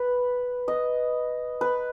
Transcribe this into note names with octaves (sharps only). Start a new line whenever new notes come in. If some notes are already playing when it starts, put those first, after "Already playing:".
Already playing: B4
D#5
B4